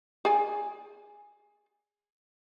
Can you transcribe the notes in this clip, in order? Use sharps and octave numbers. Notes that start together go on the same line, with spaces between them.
G#4 D5 G#5